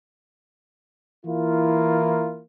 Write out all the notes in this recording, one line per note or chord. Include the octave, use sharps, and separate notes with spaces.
E3 A#3 E4 F4